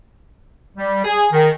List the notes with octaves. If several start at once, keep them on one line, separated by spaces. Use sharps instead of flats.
G3
G#4
D#3